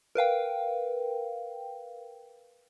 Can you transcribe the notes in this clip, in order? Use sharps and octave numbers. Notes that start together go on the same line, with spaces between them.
A#4 B4 F5 G5